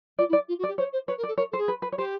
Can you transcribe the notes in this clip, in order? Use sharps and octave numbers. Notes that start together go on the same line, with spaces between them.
F4 D5
E4
D5
F4
F#4
D5
G4
C5 C#5
C5
B4 C#5
A#4
D5
A4
A#4 C#5
A4 C5
G#4
B4
B4
C#5
G4 C5